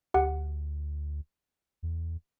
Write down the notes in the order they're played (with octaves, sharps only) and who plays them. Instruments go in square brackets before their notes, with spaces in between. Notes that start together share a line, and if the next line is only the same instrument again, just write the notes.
[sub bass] D2 [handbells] G4 F#5
[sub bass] E2